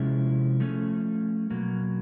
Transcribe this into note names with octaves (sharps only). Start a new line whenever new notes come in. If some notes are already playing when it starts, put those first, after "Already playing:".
Already playing: C3 F3 G#3 C#4 E4
F3 A3 C#4
B2 F#3 A#3